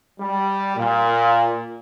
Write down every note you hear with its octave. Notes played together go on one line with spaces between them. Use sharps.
G3
A#2